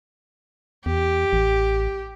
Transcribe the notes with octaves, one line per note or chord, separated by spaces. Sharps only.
E2 G4
A1